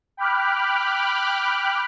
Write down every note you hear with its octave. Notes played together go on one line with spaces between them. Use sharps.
G5 B5 D6 F6 F#6